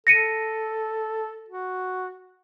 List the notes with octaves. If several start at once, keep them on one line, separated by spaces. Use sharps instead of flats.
A4 A#6 C#7 D#7
F#4